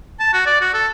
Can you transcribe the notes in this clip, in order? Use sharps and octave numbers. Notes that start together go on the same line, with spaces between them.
A5
F#4
D5
F#4
A4